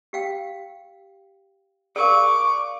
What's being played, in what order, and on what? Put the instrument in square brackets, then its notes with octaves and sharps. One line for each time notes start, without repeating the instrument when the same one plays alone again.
[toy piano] G4 F5 G5
[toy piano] G#4 A#4 [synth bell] D5 F5 [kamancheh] C#6 D6